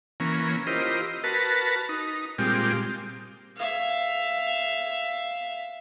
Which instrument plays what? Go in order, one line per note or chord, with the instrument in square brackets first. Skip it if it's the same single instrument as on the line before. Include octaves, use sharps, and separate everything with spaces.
[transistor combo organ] E3 A#3 C#4
E4 F4 G4 A#4 C5 D#5
F#4 A#4 B4 A5
D#4
A#2 G3 G#3 C4 F4 G4
[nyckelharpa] E5 F5